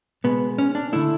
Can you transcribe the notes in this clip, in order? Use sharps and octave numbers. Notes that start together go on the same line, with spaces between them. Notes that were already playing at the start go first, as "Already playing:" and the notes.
B2 G#3 B3
C#4
D4
D3 A3 E4